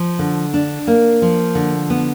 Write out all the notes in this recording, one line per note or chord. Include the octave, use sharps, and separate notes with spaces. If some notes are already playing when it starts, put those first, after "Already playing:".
Already playing: F3
D3
D4
A#3
F3
D3
B3